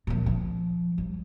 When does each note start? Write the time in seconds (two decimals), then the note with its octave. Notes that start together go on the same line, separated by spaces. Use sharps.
0.07 A#2 F3
0.26 F3
0.98 G3